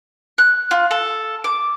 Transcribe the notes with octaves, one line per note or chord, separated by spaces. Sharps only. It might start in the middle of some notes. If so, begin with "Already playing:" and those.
F#6
F4
A4
D6